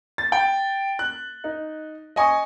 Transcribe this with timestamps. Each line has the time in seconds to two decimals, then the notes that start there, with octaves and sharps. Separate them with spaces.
0.18 A6
0.32 G5
0.99 F#6
1.44 D#4
2.16 D#5 G#5 C#6 D#6